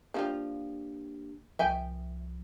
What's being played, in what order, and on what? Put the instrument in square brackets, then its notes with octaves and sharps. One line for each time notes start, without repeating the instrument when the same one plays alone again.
[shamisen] F3 G3 F4 [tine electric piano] A#3 D4 G4
[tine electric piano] C2 F3 [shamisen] E5 G5 G#5